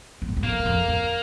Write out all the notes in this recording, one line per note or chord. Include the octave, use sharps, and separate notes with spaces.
G#2
G2
F#2
F2 A#3
F#2
F2
F2